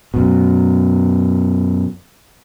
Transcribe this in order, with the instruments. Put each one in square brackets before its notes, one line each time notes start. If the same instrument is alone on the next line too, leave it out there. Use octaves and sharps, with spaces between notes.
[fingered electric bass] F#2 B2